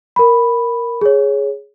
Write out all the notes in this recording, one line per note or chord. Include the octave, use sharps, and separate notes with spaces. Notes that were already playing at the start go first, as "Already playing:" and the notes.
A#4 B5
G#4 C#5